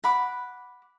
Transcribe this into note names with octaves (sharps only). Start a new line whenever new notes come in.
F#5 B5 D6